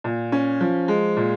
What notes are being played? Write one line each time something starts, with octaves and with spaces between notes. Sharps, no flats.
A#2
C#4
F3
G#3
A#2